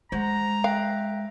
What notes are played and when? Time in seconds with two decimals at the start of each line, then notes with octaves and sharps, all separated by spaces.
0.12 G#3 C5 F#5 A#5
0.64 E5 F5 G5 F#6